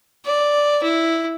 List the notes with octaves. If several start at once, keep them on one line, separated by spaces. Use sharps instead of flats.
D5
E4